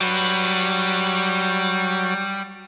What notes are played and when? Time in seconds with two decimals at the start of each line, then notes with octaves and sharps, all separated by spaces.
0.01 F#3 G3 B4